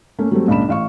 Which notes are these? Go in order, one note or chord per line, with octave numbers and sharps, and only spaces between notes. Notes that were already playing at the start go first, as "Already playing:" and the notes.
A3 A#3 C#4
F#3 G3 A3 C4
C#2 A#2 D4 B5 E7
A1 F5 C#6